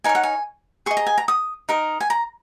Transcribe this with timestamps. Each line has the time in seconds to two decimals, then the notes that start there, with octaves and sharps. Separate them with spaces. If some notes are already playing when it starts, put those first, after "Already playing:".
0.04 D#4 A#4 C#5 G#5
0.15 F#5
0.23 G#5
0.86 G#4 D#5 C#6
0.97 A#5
1.06 G#5
1.18 A#5
1.28 D#6
1.69 D#4 A#4 D#5
2.00 G#5
2.10 A#5